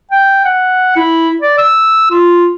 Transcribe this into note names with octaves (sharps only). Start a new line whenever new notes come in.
G5
F#5
E4
D5
E6
F4